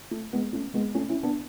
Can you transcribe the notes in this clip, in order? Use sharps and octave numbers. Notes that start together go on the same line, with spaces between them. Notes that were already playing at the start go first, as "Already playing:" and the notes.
A3
G#3 B3
A3 C#4
G#3 B3
A3 C#4
C#4 E4
B3 D4